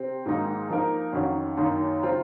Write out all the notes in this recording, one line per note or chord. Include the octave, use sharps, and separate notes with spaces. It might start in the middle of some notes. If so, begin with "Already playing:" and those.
Already playing: C3 C4
G#2 D#3 F#3 A#3 D#4
F3 A#3 D#4 A#4
F2 D#3 F#3 C#4 F#4
F#2 D#3 A#3 D#4
C#3 F#3 C4 F4